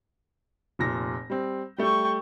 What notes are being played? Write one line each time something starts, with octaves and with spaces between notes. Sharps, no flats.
F1 A#2 A#6
G3 C4
G3 A3 G5 C#6